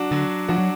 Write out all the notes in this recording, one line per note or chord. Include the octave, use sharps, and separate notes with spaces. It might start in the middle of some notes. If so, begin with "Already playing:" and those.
Already playing: F#3 D4 F#4
D3 F#3
F3 D4 F#4
F#3